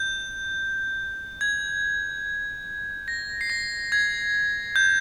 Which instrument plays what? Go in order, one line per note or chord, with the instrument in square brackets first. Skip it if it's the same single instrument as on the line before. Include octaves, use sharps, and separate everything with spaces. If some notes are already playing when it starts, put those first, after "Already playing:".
Already playing: [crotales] G6
G#6
A#6
C7
A#6
G#6
G6